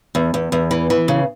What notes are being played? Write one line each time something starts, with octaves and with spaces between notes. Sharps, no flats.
E2
E2
E2
E3
E3
C#3